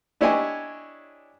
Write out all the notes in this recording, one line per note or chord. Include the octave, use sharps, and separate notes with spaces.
D4 E4 G4 C#5 D#5 G#5